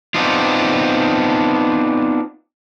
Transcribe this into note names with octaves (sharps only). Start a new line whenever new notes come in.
B3 C4 D4 D#4 F4